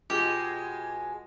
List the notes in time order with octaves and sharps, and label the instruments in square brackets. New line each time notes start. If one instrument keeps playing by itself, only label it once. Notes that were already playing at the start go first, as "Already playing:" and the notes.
[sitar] B2 G#3 [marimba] F4 G#4 [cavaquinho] G4